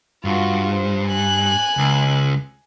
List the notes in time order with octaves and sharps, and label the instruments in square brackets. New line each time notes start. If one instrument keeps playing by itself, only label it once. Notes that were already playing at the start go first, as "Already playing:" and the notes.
[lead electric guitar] G2 [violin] F4 F#4
[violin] C5
G#5 F#6
[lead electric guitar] C#2